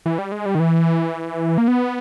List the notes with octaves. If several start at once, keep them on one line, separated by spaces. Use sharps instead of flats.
E3
G3
G#3
G3
D#3
E3
A#3
B3